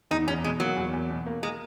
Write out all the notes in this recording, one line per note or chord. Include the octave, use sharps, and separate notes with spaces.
E2 D#4
E2 C#4
B2 G#3
F#3 A#3
E2
E2
B2
A#3
G#3 A#4